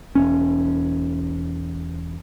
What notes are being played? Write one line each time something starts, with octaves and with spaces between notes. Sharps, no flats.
E1 C#4